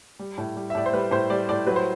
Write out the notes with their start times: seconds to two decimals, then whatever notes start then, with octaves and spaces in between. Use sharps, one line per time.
0.19 G3
0.38 A2
0.56 G3
0.70 E5
0.75 A2 D5
0.86 C5
0.93 G3 B4
1.11 A2 C5
1.30 G3 D5
1.49 A2 D5
1.66 F#3 B4
1.76 C5